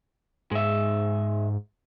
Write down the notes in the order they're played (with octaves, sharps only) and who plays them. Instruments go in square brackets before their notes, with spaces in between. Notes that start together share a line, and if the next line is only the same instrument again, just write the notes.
[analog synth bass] G#2 [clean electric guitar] G#3 E5